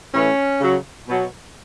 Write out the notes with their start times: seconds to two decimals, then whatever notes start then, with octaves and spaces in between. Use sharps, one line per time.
0.14 A2 E3 C#4
0.60 C#3 F#3
1.08 B2 F#3